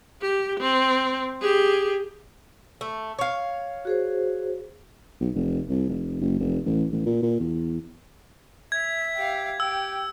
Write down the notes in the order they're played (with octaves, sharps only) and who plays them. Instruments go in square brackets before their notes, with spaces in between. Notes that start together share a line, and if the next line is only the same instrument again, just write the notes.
[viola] G4
C4
G4 G#4
[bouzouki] A3
C#5 F5
[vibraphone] F#4 G#4 C5
[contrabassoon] B1
F1
C2
F1
F#1
F1
A1
A1
A#2
A#2
E2
[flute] E5 [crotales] G#6
[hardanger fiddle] G4 F5
[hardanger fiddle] G4 G5 [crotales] E6